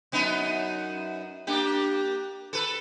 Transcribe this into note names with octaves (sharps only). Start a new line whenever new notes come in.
F#2 B3 D#4
A#3 D4 G4
A4 B4